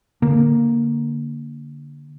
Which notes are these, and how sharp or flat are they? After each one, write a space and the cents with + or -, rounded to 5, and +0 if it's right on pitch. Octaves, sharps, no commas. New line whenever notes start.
D3 -10 A#3 +0